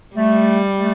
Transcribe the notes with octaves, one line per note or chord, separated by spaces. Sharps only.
G3 A3
A3